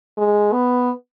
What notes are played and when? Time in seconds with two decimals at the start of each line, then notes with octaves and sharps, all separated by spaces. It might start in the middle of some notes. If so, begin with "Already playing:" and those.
0.18 G#3
0.53 B3